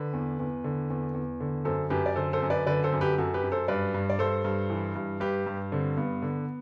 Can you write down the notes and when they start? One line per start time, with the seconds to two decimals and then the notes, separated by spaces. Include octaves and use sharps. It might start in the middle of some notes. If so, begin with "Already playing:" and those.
Already playing: D3 B4
0.13 E2
0.39 E2
0.64 D3
0.90 E2
1.14 E2
1.40 D3
1.65 F#2 A4 C5
1.90 F#2 G4 B4
2.06 D5
2.16 D3 A4 C5
2.33 A4 C5
2.42 F#2
2.50 B4 D5
2.66 D3 B4 D5
2.84 A4 C5
2.92 F#2
3.01 G4 B4
3.18 F#2 F#4 A4
3.34 G4 B4
3.43 F#2
3.52 A4 C5
3.68 G2 B4 D5
3.94 G2
4.10 D5
4.19 G2 A4 C5
4.45 G2
4.70 E3
4.95 G2
5.20 G2 G4 B4
5.47 G2
5.72 D3 C4
5.97 G2 B3
6.22 D3